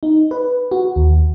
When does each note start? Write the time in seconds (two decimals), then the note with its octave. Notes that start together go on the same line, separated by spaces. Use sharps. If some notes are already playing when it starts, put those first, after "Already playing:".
0.03 D#4
0.31 B4
0.71 F#4
0.96 D#2